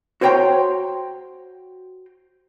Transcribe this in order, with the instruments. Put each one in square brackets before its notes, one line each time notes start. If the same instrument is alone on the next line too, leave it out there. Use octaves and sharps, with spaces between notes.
[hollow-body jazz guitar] F#4 C5 C#5 G5 A#5 C6